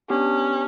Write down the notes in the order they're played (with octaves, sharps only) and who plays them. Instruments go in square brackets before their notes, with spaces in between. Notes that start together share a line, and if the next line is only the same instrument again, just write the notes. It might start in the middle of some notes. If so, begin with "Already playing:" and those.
[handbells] B3 D4 G4 [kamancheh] C#4